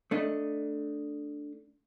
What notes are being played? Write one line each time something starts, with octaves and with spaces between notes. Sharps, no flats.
A3 D4 D#5